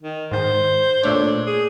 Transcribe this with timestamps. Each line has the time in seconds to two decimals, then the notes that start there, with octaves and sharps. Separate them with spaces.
0.03 D#3
0.31 G#2 D#3 C5
1.03 A#2 A3 D4 C#5
1.47 G#4